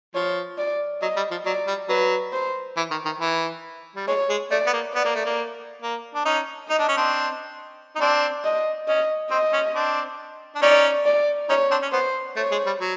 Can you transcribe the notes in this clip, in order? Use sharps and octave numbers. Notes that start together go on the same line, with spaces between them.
F3 C#5
D5
F#3 D#5
G3
F3
F#3 D5
G3
F#3 B4
C5
E3
D#3
D#3
E3
G3
G#3 C#5
G#3
A3 D5
B3
A#3
B3 D5
A#3
A3
A#3
A#3
D4
C#4 D#4
D#4 D#5
D4
C#4
C4 D4
D#4
C4 D4 D5
D#5
C#4 D#5
C4 D#5
C#4
C4 D4
D4
C#4 D#4 D5
D5
C#4 D#4 C#5
C4 D4
C#4
B3 C5
A3 C#5
G#3
G3
F#3